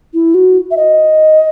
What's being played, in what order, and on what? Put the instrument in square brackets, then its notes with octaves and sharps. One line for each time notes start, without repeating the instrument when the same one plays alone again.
[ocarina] E4
F#4
E5
D#5